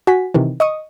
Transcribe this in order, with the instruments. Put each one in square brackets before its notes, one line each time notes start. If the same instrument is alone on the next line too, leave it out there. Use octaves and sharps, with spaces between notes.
[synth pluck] F#4 G#5 B6
C3 D#3 E3
D#5 C#6 D#6